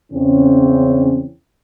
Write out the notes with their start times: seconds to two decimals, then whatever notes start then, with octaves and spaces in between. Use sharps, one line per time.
0.12 E2 C#3 C4 C#4